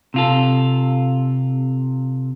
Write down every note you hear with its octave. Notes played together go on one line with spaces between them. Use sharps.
C3 F4 A4